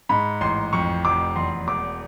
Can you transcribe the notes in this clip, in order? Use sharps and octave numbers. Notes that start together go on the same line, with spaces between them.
G#2 B5
A1 C6
F2 C#6
F1 D6
E2 C6
E1 D6